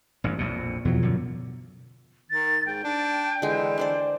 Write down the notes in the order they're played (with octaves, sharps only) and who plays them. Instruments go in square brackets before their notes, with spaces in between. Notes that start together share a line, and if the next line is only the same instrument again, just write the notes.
[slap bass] A1 G2
A#1 F2 B2
[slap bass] E2 F#3 [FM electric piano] B2 F3
[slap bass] F#2 D3
[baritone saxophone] D#3 [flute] A6
[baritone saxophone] G#2 [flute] G5
[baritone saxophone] D4
[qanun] D3 G#3 [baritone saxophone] E3
[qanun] D4 C5 D5